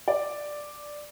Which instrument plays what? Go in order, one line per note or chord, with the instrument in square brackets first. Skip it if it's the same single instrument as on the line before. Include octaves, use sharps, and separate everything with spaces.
[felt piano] D5